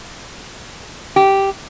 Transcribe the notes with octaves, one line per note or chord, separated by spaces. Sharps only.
G4